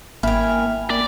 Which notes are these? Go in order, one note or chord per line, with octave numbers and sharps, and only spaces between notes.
G#1 A#3 E4 G5 G#5 F6
A#3 D5